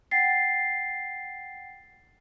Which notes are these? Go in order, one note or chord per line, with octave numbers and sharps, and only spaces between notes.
F#5 G5 A6 C7